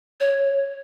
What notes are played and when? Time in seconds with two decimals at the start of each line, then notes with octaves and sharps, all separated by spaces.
0.20 C#5